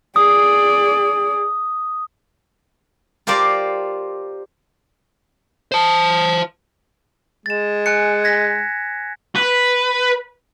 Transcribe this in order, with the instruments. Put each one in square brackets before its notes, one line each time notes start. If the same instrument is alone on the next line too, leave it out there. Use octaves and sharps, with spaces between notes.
[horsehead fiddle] G#4 D5 [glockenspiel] D#6
[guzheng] F4 G4 A#4 C5 D5
[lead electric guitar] C5 A5
[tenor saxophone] G#3 [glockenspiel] A6 E7
[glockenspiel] G#5 F#6 C#7
G#6 A#6 B6
[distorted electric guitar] B4